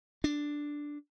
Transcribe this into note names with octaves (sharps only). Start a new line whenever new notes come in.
D4